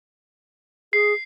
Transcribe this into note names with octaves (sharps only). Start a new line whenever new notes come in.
G#4 C7